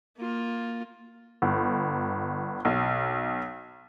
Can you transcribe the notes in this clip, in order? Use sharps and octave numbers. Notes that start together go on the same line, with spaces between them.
A#3 F4
G1
B1